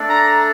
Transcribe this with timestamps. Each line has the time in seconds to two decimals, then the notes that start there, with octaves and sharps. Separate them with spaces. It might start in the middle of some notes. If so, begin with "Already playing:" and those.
Already playing: A3 D4 A4 D5
0.10 A#5